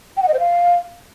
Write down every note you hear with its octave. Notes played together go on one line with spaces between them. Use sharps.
G5
F#5
D#5
C5
F5